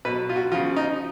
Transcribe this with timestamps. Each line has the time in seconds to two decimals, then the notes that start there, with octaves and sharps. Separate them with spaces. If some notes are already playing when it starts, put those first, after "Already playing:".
0.05 B2 B4
0.08 F#3
0.29 F4
0.36 F#4
0.52 C#3 F3 F4
0.76 D#4